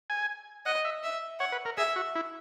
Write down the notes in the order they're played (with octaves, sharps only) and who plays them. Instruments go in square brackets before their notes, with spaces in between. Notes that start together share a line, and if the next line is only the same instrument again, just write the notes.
[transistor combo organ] G#5
[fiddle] D#5 [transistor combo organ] F#5
[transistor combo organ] E5
[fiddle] E5
[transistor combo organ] C#5 [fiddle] F#5
[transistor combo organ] B4
A#4
[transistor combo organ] G#4 [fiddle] E5
[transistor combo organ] F#4
E4